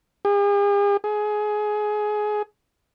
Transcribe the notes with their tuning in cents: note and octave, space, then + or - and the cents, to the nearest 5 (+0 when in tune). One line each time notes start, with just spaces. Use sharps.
G#4 -45
G#4 +20